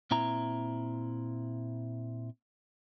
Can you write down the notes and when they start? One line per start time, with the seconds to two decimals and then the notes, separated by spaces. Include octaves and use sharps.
0.11 A#2 C4 E4 A#5